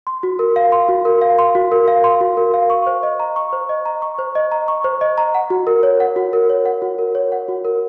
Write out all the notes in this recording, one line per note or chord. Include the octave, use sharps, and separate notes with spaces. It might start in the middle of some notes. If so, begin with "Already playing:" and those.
C6
F#4
A#4
F5
C6
F#4
A#4
F5
C6
F#4
A#4
F5
C6
F#4
A#4
F5
C#6
C5
D#5
A#5
C#6
C5
D#5
A#5
C#6
C5
D#5
A#5
C#6
C5
D#5
A#5
F#5
F#4
A#4
C#5
F#5
F#4
A#4
C#5
F#5
F#4
A#4
C#5
F#5
F#4
A#4